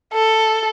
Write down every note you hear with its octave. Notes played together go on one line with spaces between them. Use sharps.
A4